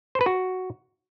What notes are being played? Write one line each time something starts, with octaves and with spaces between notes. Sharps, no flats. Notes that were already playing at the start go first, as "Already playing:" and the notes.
C5
B4
F#4